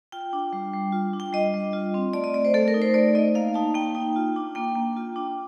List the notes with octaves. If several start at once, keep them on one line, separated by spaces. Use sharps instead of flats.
F4 G5
D4
G3
G3
F4
D4
G5
G3 D#5
G3
F4
C4
A3 D5
D#5
A3 D5
C5
A3 A4
A#4
D#4
C5
A3 D5
D#4 D#5
A#3 F5
D#4 A5
A#3 G5
D#4
F4
D4
A#3 G5
A#3
F4
D4